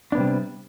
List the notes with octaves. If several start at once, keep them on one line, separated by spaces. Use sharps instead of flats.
C3 G3 B3 D4